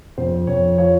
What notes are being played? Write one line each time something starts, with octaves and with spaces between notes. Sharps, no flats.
F2 C5
F2 C#5
F3 C#5